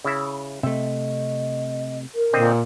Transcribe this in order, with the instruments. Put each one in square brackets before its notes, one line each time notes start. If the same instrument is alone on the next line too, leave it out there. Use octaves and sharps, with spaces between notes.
[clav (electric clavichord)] C#3 E4 E5
[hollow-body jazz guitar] C3 A3 [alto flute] D#5 [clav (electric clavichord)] E5
[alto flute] A#4
[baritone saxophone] A#2 [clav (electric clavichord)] D3 C4 D#5